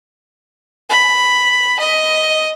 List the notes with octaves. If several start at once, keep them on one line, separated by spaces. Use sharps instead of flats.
B5
D#5